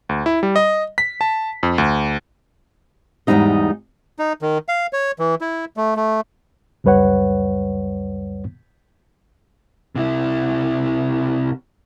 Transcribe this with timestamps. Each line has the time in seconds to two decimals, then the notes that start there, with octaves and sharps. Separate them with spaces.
0.09 D2
0.26 E4
0.43 G3
0.56 D#5
0.98 B6
1.21 A5
1.63 F2
1.78 D2
3.27 E2 G#2 D#3 G3 D#4 D#5
4.19 D#4
4.42 D#3
4.69 F5
4.93 C#5
5.19 E3
5.41 E4
5.77 A3
5.97 A3
6.84 C#2 F#2 G3 B4 C#5 F#5
9.96 C3 E4